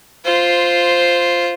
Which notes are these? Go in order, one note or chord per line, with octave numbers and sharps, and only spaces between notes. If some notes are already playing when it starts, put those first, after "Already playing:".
F4 C5